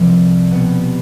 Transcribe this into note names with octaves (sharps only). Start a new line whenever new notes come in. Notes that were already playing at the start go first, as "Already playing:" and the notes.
Already playing: C2 C3 F3
B2 G3 B3